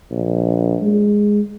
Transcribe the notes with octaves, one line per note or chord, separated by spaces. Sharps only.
A#1
G#3